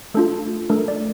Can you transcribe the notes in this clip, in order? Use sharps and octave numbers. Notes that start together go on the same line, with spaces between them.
A3 D4 F4 A4
A3 D4 A4 A#4
D5